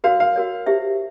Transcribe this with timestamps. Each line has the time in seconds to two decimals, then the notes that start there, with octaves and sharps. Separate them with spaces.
0.04 F#4 A#4 C#5 F5
0.20 F5
0.36 F#4 A#4 C#5
0.66 E4 G4 C5 E5